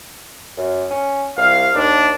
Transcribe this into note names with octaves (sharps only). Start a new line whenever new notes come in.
F#2
C#4
C2 F5
D#2 D4